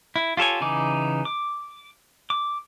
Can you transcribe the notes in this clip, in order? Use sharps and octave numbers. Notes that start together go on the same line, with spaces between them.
E4
F4 G4 A4 C#5 G#5
C#3 E3 D#4 G#5 D6
D6
D6